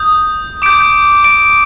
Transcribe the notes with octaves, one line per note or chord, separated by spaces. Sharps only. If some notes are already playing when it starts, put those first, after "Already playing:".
Already playing: D#6 G6
D6 G6 D7
D7